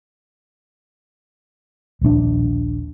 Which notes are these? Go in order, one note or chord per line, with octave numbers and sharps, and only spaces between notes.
D#1 A#1 C4 D4